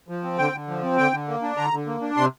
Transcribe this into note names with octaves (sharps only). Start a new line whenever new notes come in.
F3
C4
D3 G5
D3
F3
C4
D3 G5
D3
A#3
D4
D3 A#5
D3
A#3
D4
C3 C6